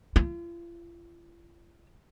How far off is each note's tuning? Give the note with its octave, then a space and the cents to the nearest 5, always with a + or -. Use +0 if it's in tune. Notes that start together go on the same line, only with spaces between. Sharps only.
F4 -40